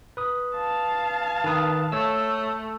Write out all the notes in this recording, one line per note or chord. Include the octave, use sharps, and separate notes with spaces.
B4 D#6
F5 A5
D#3 B4 D#6
A3 C#5 E6